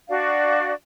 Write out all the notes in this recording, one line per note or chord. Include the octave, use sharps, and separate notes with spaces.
D4 F#4 D5 F5